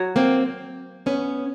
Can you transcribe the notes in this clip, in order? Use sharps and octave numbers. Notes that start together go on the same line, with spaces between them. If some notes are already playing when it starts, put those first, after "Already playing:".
Already playing: F#3
A#3 C4
B3 C#4